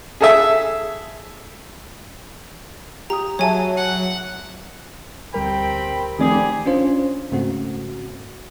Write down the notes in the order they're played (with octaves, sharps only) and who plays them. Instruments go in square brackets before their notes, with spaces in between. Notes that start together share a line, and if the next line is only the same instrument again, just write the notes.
[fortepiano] G#4 A4 E5
[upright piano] G4 D#6 [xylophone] A#5
[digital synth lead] F#3 [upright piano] G#4 E5 A5 [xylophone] C#5 G#5
[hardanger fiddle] F#5
[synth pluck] D2 G3 A#4 [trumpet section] C4 G5 B5
[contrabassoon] F1 [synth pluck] D#3 C4 D5 [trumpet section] G4 G#4
[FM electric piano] C#4 D4 F4 C5
G#2 C#3 A3 C4 F#4